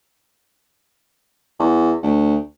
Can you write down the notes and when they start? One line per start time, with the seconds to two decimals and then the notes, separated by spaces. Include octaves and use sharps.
1.59 E2
2.03 D2